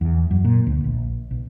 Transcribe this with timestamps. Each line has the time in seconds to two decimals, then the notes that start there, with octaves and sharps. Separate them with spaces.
0.01 E2
0.31 F#2
0.45 A#2
0.67 D2
0.84 A#1
1.31 B1